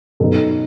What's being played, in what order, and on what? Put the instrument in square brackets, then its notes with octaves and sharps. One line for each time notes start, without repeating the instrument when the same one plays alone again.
[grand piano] B2 F#3 B3 D#4 A4